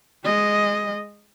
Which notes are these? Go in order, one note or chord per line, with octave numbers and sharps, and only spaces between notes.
G#3 D#5